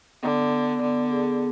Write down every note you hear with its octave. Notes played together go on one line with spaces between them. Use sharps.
D3 B3
B3
D3 B3
G#4